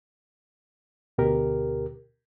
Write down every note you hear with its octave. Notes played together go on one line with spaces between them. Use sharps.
D2 B2 G4 A#4